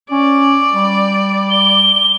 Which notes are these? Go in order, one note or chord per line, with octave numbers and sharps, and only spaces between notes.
C#4 D5
G3
G7